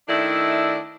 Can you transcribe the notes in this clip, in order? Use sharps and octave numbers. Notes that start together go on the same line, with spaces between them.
D#3 A3 D4 E4 D5